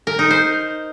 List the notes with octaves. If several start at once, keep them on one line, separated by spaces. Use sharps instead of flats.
A#4
D#4
C5